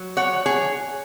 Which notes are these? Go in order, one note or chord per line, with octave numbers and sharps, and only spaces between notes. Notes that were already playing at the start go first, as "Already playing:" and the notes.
Already playing: F#3
C#5 F#5
G#4 C#5